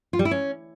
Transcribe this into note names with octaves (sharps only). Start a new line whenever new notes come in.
F4
G3
E4
C#4